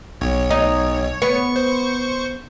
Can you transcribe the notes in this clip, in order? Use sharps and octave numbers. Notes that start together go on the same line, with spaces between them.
B1 C#5
D#4
B3 C#6
C5